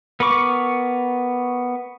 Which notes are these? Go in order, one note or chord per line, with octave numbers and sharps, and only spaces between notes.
B3 A#4 B5 C#6 D6